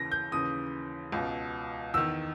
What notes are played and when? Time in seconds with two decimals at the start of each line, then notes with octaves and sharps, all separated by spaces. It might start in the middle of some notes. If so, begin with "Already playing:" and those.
Already playing: D#2 C#3 E3 A#6
0.12 G6
0.32 D#2 C#3 E3 D#6
1.12 C#2 B2
1.94 E2 D#3 E6